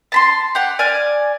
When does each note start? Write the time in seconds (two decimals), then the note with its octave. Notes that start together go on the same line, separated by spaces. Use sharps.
0.12 A5 B5 C6
0.55 G4 F#5
0.79 D5 G#5 F6